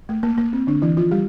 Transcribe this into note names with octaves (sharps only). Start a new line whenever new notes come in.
A3
A#3
A#3
C4
D3 D4
E3 E4
F3 F4
G3 G4